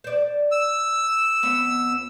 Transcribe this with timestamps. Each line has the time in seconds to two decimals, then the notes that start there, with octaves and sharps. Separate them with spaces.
0.04 C5 D5
0.52 E6
1.43 F2 B3 C#4